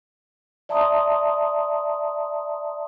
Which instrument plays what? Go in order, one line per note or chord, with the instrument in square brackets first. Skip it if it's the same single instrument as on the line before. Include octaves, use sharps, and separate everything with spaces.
[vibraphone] D5 E5 A5 A#5 C6 D#6